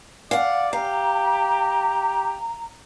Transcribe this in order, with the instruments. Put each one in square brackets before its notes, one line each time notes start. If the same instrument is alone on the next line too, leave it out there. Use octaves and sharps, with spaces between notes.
[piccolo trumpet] D5 [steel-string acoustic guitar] F5 F#5
[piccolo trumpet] G4 [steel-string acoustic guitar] F5 [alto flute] A#5